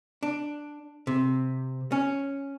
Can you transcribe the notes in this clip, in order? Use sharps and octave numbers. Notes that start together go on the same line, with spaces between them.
D4
C3
C#4